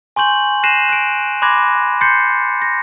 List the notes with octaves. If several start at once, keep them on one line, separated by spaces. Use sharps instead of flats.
G#5 C6 C#6 G6 F#7
F#6 A#6 C7 D#7 E7
F#6 D7
B5 C6 D6 F#6 G#6 A#6
C6 G6 A6 C7 C#7
A#6